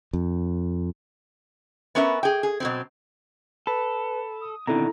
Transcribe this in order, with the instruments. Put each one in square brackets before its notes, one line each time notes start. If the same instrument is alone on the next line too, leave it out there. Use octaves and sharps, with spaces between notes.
[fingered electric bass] F2
[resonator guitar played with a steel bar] B3 C#4 A#4 B4 E5
G#4 G5
G#4
B2 F#3 C4
[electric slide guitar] A4 [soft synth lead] B4 [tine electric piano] B5
[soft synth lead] D#6
[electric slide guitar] B2 D3 D#3 [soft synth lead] C4 [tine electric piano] E4 A4 A#5